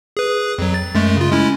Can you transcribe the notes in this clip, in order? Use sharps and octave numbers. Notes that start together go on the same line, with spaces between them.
G#4 B4
F2 F#3
A6
F#2 G#3 A3
C#3 F4
G#3 C#4 E4